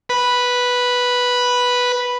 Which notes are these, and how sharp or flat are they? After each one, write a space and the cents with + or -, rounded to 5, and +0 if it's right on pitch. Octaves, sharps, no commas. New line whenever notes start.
B4 -5